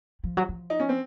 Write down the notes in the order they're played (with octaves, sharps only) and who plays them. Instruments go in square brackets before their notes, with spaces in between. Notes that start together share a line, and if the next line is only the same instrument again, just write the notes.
[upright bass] F3
F#3
F3
[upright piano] D#4
C#4
C4